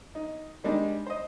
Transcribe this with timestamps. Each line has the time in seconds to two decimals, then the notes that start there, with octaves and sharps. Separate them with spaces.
0.15 D#4
0.64 D#3 G3 G#3 D4 D#4
1.07 C5 D#5